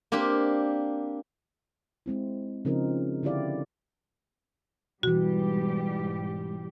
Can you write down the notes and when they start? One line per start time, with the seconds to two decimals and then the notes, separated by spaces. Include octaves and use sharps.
0.12 A#3 C4 D4 G4
2.06 G#3 C4 E4
2.65 C#3 F3 C4 D#4 A#4
3.23 D3 E4 G4 D5 F5
5.03 G#2 B2 E3 G3 F#4 G4